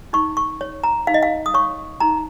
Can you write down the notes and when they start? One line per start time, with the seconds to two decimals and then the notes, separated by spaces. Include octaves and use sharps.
0.13 D#4 C#6
0.37 C#6
0.61 C#5
0.84 A#5
1.07 D#4 F5
1.14 D#5
1.22 F5
1.46 D#6
1.54 C#5 C#6
2.00 D#4 A#5